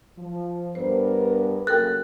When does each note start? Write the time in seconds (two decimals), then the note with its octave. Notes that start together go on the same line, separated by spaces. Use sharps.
0.17 F3
0.75 G2 B3 A#4 C5
1.67 C#3 F#3 A#3 A4 A#4 G5 F#6